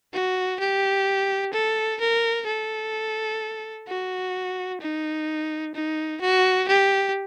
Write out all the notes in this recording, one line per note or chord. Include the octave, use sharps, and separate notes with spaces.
F#4
G4
A4
A#4
A4
F#4
D#4
D#4
F#4
G4